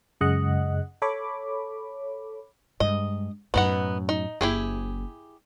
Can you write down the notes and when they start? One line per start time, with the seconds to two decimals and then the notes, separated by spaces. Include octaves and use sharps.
0.21 F#2 C#3 G#3 D#5 F#5 F#6
1.02 A4 C#5 B5 D6
2.80 G2 G#3 D#5
3.54 F#2 A2 B3 D#4 F#5
4.09 D#4
4.41 F#1 E4 G4 G#4